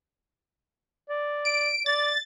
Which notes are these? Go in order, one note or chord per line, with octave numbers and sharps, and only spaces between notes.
D5
D7
D5 A6